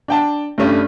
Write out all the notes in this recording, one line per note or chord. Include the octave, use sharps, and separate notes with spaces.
D4 G5 A5
G2 G3 A3 C#4 D4